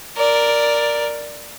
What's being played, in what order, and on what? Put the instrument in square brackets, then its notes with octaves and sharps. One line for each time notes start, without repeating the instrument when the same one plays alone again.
[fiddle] A#4 D5